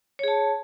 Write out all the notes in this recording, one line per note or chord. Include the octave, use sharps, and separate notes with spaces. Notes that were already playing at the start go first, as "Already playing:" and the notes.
G#4 C#5 A5